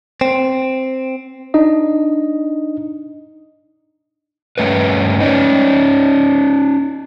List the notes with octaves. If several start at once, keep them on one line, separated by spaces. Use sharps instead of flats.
C4
D4 D#4 D#5
G2 D#3 A3 C#4 B4
C#4 D#4